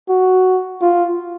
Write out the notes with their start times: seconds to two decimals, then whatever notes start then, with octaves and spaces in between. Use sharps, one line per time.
0.09 F#4
0.82 F4